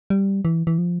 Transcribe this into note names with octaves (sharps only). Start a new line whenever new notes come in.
G3
E3
E3
F3